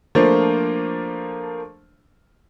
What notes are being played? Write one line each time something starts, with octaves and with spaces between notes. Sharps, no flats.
F3 A3 A#3 D4 F4 C5